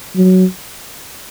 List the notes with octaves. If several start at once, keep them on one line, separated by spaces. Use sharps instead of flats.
F#3